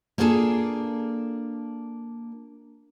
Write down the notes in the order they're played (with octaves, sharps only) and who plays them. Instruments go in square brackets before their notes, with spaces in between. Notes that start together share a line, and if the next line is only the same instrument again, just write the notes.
[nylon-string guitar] A#3 D4 F4 G#4 A4